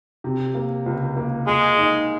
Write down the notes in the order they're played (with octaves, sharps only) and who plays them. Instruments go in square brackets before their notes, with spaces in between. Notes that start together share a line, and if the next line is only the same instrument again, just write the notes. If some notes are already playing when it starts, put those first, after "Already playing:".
[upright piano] C3
A#3
C#2
A#3
[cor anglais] G#3 [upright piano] G#4
[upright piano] D#4